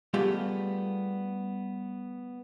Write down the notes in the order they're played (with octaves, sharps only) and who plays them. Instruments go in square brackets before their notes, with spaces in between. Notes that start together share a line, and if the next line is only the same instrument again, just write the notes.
[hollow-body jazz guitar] G3 A3 B3 F4 G4 G#4